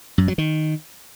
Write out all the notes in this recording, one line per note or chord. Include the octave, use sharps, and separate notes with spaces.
F#2
F#3
D#3